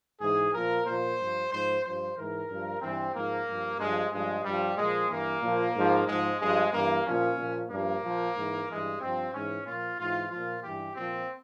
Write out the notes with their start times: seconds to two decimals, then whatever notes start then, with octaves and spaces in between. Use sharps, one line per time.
0.20 G#2 E3 G#4
0.53 A#2 F3 A#4
0.86 A#2 F3 C5
1.19 G2 F3
1.51 G#2 F3 C5
1.83 G2 F3 C5
2.16 G#2 E3 A#4
2.48 G2 F3
2.82 G2 E3 C4
3.14 G#2 F3 A#3
3.47 G2 F3
3.78 G2 F3 G#3
4.11 G2 F3 G#3
4.44 G2 F3 G3
4.76 A#2 F3 G#3
5.09 G2 E3 A#3
5.42 A#2 F3
5.75 G#2 F3
6.07 G#2 F3 G#3
6.40 G2 F3 G#3
6.72 G2 E3 A#3
7.05 A#2 F3 C#4
7.37 A#2 F3
7.69 G2 F3 A#3
8.03 A#2 F3
8.36 G#2 E3
8.67 G2 E3 G#3
9.00 G2 F3 C4
9.33 G#2 E3 C#4
9.65 A#2 F3 F4
9.98 G#2 E3 F4
10.30 A#2 F3 F4
10.63 G2 E3 G4
10.95 A#2 F3 C4